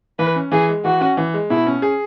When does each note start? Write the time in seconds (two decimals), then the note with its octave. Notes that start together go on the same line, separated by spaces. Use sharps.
0.19 E3 B4
0.36 C#4
0.52 E3 G#4
0.68 G#3
0.85 E3 F#4
1.01 C#4
1.17 E3
1.34 G#3
1.50 B2 E4
1.67 C#4
1.82 G#4